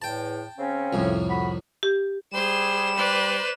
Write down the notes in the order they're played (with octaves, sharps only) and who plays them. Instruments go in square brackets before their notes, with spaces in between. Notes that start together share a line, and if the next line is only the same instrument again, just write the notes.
[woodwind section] E2 A2 [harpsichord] G5 A5
[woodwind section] C#3 C4 C#4
[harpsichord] C2 F2 A2
[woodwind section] F#4 B5
[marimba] G4
[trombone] G3 [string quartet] G#4 C5 [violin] E7
[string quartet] B4 C5 D5